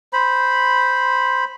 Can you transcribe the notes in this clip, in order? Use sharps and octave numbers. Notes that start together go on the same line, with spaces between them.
C5 B5